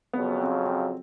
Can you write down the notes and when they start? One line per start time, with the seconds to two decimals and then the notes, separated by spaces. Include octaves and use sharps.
0.13 F2 C#3 F#3 B3
0.40 C4
0.66 C4